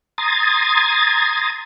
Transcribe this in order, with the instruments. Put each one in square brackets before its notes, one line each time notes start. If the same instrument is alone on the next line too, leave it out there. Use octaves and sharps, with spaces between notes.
[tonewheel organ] A#5 C6 D#6 G#6 A6